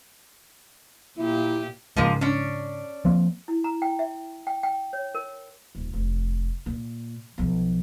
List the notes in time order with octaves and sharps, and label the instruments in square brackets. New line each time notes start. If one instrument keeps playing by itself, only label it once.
[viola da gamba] A#2 A#3 G4 [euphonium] E4
[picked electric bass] G#2 C#3 [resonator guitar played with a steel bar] F3 G#3 A#3
[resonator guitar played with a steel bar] C#4 D4
[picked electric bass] F3 A#3 C4
[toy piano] E4
A#5
G5
E5
G5
G5
C#5
A#4
[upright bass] D#1
F1
A#2
B1 F3